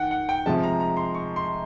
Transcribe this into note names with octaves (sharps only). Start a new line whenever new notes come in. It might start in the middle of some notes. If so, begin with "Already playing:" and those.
Already playing: D#3 F#5 G5
F#5
G5
C3 F3 G#3 A5
A#5
A#5
C6
C#6
C6